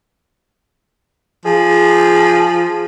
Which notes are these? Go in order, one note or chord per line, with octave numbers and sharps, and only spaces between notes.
F3 G#4